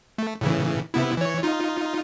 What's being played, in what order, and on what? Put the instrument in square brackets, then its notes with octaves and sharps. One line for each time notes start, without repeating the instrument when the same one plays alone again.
[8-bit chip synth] A3
A2 C#3 E3
C3 B3 E4
E3 C#5
D#4 F4